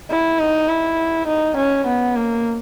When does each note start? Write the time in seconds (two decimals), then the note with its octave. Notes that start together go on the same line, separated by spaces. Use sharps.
0.11 E4
0.40 D#4
0.69 E4
1.27 D#4
1.57 C#4
1.87 B3
2.16 A#3